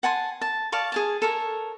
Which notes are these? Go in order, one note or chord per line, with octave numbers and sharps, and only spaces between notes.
F#5 G#5 A5 C6
A5
D5 F5 A5 C#6
G#4 G#5 A5
A4 A#4 C#5